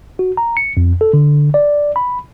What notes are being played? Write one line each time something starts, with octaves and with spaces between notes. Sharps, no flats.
F#4
A#5
C#7
F2
A4
D3
D5
B5